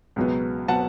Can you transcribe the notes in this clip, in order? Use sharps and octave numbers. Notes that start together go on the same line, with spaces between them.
C#2 B2 F#3 B3
B2 F#3 B3 F#5 A5